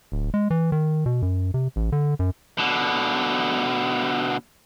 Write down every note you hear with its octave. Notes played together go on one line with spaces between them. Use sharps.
D1
G#3
E3
D#3
B2
F#2
C3
A1
D3
F#2
B2 D3